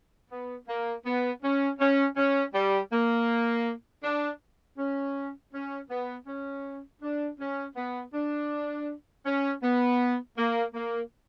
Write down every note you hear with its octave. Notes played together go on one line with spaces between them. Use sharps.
B3
A#3
B3
C#4
C#4
C#4
G3
A#3
D4
C#4
C#4
B3
C#4
D4
C#4
B3
D4
C#4
B3
A#3
A#3